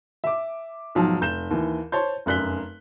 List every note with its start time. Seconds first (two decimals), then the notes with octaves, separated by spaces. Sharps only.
0.24 E5 D6
0.95 B1 G#2 F3 F#3
1.21 F1 G6 E7 G7
1.51 D#2 E3
1.92 C5 C#5 A5 C6 G6
2.26 F1 F#2 F#6 B6 G7